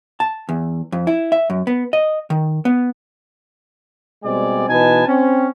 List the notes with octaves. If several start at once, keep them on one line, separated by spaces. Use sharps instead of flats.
A5
E2
F2
E4
E5
F#2
B3
D#5
D#3
B3
B2 G3 G#3 C4 D5 G#5
B2 E3 D#4 B4 G#5 A5
C4 C#4